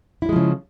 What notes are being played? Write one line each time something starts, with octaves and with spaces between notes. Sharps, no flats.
C#3 F3 G3 G#3 E4